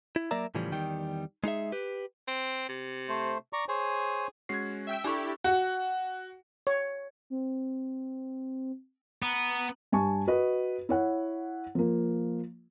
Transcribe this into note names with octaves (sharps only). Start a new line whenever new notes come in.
E4
F#3 A#3 A#4 D5 E5 A#5
A2 C#3 E3 F3 G3
E2 D#3 G3 G5
G#3 D#4 G#4 E5
G4 B4
C4
C3
A3 C5
D5 A#5 C#6
G#4 C5 C#5 G#5
G#3 C#4 F#4 G#6 C7
E5 G5 E6
D4 E4 G4 A4 G#5 C#6
F#4
C#5
C4
B3 A#5
G2 G#5 A5 C#6
F#4 B4 D#5
E4 C#5 F#5
F3 A#3